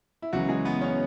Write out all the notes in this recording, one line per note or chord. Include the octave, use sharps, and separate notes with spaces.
E4
C#2 C#3 E3 F#3 F#4
G#3 G#4
B3 B4
C#4 C#5